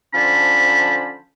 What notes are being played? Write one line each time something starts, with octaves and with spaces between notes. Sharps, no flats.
D3 F3 C#4 C5 A5 B5